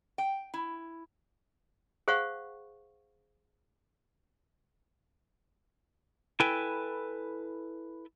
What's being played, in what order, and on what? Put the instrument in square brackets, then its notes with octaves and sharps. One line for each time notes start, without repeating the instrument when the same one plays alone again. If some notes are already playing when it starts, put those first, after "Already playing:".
[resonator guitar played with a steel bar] G5
E4
[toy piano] G#4 C5 F5 F#5 C#6
[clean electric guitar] E4 A4 B4 G5 G#5